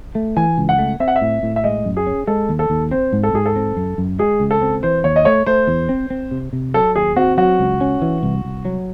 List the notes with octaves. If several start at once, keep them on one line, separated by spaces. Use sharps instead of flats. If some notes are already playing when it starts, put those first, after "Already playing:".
A3
E3 G#5
C#2
F#5
A3
C4 E5
F#5
E5
A2
A2
E5
G#3 D#5
F#2
G#4
C#4
G#3 A4
D#2
A4
D#2
C4 C5
G#2
A4
G#2 G#4
A4
C4
F#2
F#2
G#3 G#4
C#2
A4
C4
E3 C5
D#2 C#5
D#5
A3 C#5
A3 C5
E2
C4
C4
C3
C3
F#3 A4
D#2 G#4
C4 F#4
F#3 F#4
C#2
C#4
E3
C2
C2
F#3